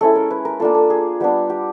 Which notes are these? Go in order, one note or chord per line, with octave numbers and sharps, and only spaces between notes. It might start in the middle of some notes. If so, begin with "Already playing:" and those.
G#3 C#4 E4 A4
A#4
B4
A#4
A#3 D4 F4 A4
A4
G#4
G3 B3 D4 G4
G4